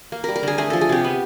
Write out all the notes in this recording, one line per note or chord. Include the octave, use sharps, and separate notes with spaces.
A#3
G3 A#4
A#4
D3 G#4
A3 G#4
F3 A4
G#4
C3 G4
B3